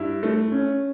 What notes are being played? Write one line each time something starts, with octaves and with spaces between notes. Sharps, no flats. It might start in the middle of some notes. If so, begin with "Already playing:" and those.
Already playing: G2 E4
A3
C#4